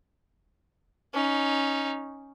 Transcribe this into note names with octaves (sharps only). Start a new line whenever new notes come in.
C#4 D#4